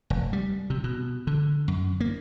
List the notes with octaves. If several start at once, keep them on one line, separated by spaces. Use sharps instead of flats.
F1
G3
C3
B2
D3
F#2
A#3